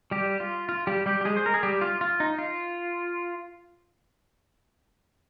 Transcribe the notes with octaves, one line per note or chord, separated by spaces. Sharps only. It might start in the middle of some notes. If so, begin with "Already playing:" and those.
G3 G4
F4
F4
G3 G4
G3 G4
G4
G#3 G#4
C5
A#4
G#4
G3 G4
F4
F4
D#4
F4